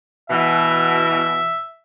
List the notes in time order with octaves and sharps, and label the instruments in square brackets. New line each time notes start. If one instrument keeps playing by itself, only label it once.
[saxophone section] B2 E3 [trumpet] E5